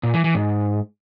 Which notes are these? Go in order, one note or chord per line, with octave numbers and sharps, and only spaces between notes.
A#2
E3
E3
G#2